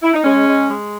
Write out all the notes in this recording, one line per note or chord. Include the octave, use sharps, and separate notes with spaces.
E4
D#4
G#3 C#4
G#3
G#3